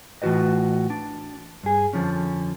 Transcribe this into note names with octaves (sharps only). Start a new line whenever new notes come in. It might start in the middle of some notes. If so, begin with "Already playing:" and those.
A2 E3 F4 F#4 B4 D#5
D4
G2 G#4
F2 D3 F3 C#4